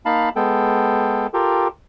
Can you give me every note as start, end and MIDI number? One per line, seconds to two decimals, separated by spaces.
0.05 0.29 58
0.05 0.29 63
0.05 0.29 77
0.05 0.29 81
0.05 0.29 83
0.36 1.27 56
0.36 1.27 59
0.36 1.27 69
0.36 1.27 79
1.34 1.68 65
1.34 1.68 67
1.34 1.68 69
1.34 1.68 70
1.34 1.68 79